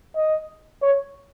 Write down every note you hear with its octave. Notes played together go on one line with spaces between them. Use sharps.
D#5
C#5